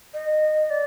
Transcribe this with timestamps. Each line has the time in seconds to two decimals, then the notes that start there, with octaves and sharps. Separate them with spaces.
0.14 D#5
0.70 D5